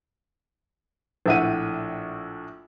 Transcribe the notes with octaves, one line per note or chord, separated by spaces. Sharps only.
A#1 A2 E5 F#5 D#7